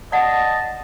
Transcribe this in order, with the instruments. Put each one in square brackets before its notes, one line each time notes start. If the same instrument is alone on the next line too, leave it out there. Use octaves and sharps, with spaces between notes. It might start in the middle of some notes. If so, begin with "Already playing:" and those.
[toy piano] D5 F#5 [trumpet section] D#5 A5